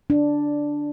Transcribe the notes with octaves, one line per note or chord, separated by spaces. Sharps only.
D4